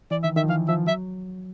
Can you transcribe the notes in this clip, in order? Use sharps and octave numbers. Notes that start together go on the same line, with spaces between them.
E3 D5
D#3 E5
D#3 E5
F3
E3 F5
F3 E5
F#3 E5